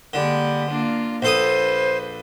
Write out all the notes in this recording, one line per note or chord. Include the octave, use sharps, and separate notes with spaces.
D3 G3 G#3 A#3
A#3 D4 F4
A#1 A4 B4 C5 D#6